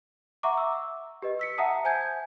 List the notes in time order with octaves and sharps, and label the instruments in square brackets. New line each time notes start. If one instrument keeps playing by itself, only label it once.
[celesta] E5 F#5 A#5 C#6 D6
E6
G4 B4 D#5
E6 B6 C#7
E5 F#5 A5 A#5 D#6
C5 G#5 A5 G6 G#6